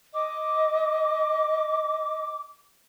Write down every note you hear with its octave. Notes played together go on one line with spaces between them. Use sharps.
D#5 D6